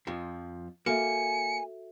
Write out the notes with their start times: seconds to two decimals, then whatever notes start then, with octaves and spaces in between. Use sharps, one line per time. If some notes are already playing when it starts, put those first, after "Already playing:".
0.07 F2 F3
0.86 A#3 F#4 A4 E5 G#5 C#7